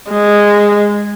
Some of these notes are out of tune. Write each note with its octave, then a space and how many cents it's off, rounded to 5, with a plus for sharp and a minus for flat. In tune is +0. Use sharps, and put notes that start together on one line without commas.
G#3 -10